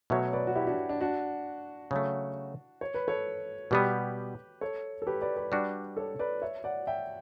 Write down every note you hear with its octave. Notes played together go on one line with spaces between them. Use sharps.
B2 F#3 A3 C#5 E5
B4 D5
F#4
E4 G4
D4 F#4
D4
D4 F#4
C#3 F#3 A3
C#5
B4
A4 C#5
B2 G3 B3 G4 B4
A4 C#5
A4
G4 B4
B4 D5
B4 D5
G3 D4 F#4
A4 C#5
B4 D5
C#5 E5
D5 F#5
E5 G5